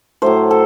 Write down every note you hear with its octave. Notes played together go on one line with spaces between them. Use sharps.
A2 F#3 A3 C5
A4